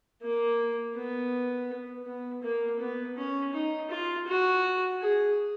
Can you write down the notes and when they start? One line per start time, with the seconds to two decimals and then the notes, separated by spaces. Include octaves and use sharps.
0.22 A#3
0.96 B3
2.06 B3
2.43 A#3
2.79 B3
3.17 C#4
3.53 D#4
3.90 F4
4.27 F#4
5.01 G#4